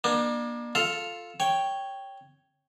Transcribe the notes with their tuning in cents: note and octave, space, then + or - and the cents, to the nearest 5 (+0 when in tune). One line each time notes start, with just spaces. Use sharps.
A#3 +40 D4 +35
F4 +0 A4 +0 F5 +0
C#5 +0 G5 +0